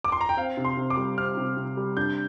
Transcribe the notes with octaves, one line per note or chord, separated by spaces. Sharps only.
D6
C6
A#5
G5
C4 F5
C3
C6
C3
D6
G3
C4 F6
C3
C3
G3
D4 G6